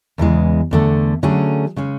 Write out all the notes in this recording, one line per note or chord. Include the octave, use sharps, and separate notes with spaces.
E2 C#3 E3 G#3
E2 D3 A3
D3 F#3 A3 C#4 G#4
C#3 G#3 C#4